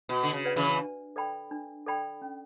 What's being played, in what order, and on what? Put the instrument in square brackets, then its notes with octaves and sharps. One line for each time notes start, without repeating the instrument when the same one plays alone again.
[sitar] B2 [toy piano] F#4
[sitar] D3
C#3
[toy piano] B4 D5 F#5
[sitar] C#3 E3
[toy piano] D4
A4 D5 G5 B5
D4
A4 D5 G5 B5
C#4